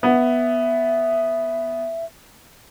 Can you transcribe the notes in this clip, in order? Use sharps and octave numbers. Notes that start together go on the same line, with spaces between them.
B3 E5